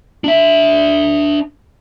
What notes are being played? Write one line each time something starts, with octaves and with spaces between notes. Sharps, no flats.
D4 E5